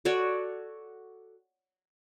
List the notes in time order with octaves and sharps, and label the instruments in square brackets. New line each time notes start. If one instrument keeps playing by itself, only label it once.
[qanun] F#4 A4 C#5 D5